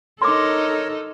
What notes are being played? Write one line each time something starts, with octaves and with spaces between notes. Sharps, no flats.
D#4 A4 A#4 C#5 C6 D6